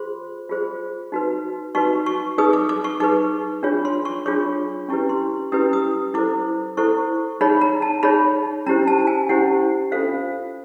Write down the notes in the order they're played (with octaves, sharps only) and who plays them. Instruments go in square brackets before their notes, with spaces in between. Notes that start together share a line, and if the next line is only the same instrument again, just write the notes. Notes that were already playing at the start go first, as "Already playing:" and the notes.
Already playing: [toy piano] F4 G#4 C5 C6
F4 G#4 C5
D#4 F#4 B4
D#4 F#4 B4 C#6
C#6
D#4 G#4 B4 D#6
D6
D6
C#6
D#4 G#4 B4 D6
D4 F4 G#4 C#5
C6
C#6
D4 F4 G#4 C#5 D6
C#4 E4 G4 B4 C#6
C6
C#4 E4 G4 B4 D#6
D#6
E4 A4 C5 D6
E4 A4 C5 C#6
D#4 G#4 C#5 B5
A#5
A5
D#4 G#4 C#5 B5
C#4 E4 G4 C5 A#5
A5
G#5
C#4 E4 G4 C5 F#5
C#4 F4 A4 C5 F5